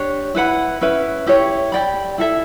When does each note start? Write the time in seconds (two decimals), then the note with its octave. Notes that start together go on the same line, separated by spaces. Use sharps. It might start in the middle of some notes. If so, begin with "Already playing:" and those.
Already playing: D4 G4 C#5
0.35 E4 B4 F#5 B5
0.81 C#4 E4 B4 E5
1.26 E4 G4 C#5
1.72 G4 D5 G5 B5
2.18 E4 A4 E5